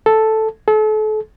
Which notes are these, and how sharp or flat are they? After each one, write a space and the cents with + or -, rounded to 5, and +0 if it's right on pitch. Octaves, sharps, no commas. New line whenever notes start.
A4 +0
A4 -35